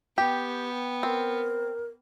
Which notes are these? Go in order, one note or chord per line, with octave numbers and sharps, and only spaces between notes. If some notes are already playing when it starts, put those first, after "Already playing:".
B3 G4 G5
C4 A#4